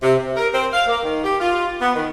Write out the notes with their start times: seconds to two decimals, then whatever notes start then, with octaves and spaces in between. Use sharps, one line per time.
0.02 C3
0.18 C3
0.36 A#4
0.54 C4
0.73 F5
0.88 A#3
1.04 D#3
1.24 G4
1.40 F4
1.81 B3
1.95 D#3